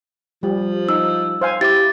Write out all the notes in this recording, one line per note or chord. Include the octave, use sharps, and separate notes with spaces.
F3 G3
D#4 E6
C5 F5 G#5
E4 G4 D6 A6